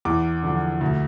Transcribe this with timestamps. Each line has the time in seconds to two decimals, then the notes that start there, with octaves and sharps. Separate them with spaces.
0.05 E2 D6
0.43 D3 F3
0.81 D2